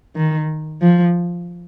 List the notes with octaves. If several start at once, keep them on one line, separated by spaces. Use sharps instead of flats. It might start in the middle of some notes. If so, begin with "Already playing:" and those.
D#3
F3